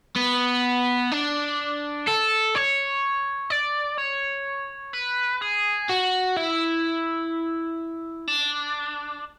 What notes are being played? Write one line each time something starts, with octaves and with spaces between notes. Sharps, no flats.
B3
D4
A4
C#5
D5
C#5
B4
G#4
F#4
E4
D4